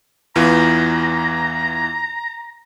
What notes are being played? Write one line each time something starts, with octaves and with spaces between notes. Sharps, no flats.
E2 E3 F4 A#5